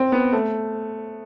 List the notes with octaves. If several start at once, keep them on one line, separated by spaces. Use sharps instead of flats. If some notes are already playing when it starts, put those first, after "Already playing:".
Already playing: C4
B3
A3